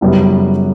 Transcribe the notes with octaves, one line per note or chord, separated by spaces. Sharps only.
F#2 C#3 G3 B3 E4